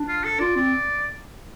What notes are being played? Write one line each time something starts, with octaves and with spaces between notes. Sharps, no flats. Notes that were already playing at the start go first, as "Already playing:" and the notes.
Already playing: D4
F4
A4
F4 D5
C4 D5